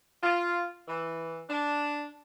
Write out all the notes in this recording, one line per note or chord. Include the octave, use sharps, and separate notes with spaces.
F4
E3
D4